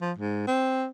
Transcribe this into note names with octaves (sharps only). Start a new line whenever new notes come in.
F3
G#2
C4